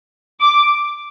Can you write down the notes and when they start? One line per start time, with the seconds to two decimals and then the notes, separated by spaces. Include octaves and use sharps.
0.40 D6